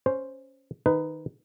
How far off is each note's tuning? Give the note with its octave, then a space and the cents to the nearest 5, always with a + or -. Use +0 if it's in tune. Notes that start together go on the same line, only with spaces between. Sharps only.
C#4 +0 C5 +0
D#3 +0 D#4 +0 B4 +20